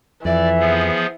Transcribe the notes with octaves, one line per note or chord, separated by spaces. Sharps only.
F2 E3 D5 E5
F3 B3 G#4